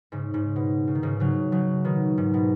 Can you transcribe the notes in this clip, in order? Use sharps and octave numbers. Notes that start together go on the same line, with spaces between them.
G#2 C#3
G#2 C#3
B2
C#3
D#3
G#2 C#3
C#3 F#3
C#3 F#3
B2 D#3
G#2
B2